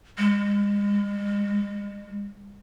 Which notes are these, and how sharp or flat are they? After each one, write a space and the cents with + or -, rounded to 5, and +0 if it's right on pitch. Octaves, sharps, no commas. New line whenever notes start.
G#3 -40